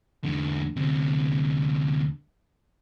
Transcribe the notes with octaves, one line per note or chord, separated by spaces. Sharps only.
E2 D3
D2 C3